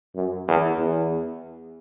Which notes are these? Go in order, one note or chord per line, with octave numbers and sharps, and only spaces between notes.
F#2
E2
E2